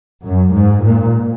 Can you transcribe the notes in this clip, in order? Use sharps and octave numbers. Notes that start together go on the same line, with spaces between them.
F#2
G#2
A#2